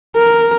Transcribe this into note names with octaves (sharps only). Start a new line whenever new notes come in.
A#4